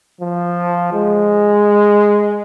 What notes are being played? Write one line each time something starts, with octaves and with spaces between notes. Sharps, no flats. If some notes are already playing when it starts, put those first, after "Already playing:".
F3
G#3